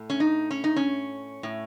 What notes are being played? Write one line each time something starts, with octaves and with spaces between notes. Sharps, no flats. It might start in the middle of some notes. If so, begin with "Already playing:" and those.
Already playing: A2
C#4
D#4
C#4
D#4
C#4
A2